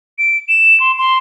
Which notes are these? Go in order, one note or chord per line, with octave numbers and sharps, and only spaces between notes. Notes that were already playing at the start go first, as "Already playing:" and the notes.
D7
E7
C6
C6